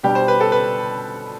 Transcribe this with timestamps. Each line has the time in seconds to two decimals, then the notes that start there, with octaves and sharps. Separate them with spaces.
0.03 B2 G3 D4 G4
0.15 C5
0.28 B4
0.40 A4
0.52 B4